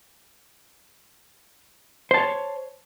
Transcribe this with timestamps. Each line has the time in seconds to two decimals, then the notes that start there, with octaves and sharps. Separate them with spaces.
2.11 C5
2.14 A5
2.18 C#5